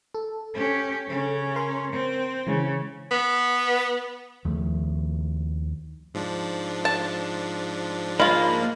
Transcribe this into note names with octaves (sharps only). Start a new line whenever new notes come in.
A4
C#4 G4
C#3 C#4
A#4 C6
C4
C#3 E3 G#3 C#4
B3
D#2 F3 A3
G#2 F3 D4
A5
G#3 A#3 F4 B5 F6